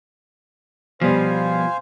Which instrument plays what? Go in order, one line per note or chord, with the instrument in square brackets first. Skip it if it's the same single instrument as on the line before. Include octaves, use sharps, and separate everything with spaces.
[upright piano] B2 G3 [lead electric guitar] F3 B3 [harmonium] C5 F5 G#5